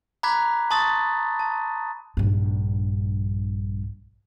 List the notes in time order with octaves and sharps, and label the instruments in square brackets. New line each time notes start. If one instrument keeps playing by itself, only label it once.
[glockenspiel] A#5 B5 D6 F#6 G#6 B6
A5 C6 C#6 D#6 A6
A5
[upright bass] A#1 G2